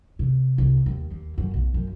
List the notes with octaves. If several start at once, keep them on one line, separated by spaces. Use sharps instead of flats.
C3
C2
D#2
D#2
F#2
B1
F#2